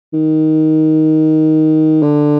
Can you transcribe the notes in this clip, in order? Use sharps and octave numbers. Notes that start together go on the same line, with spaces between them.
D#3
D3